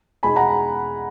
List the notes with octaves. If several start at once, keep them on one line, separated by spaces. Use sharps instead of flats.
E2 B2 G#3 D#4 G#5 B5
F#5 A#5